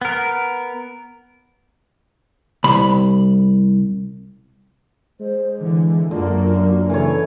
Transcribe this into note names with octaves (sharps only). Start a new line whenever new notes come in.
B3 A#4
C2 B5
G#3 C5
D3 E3
F#2 D3 A#3 F4
F#3
C#3 E3 A4 C#5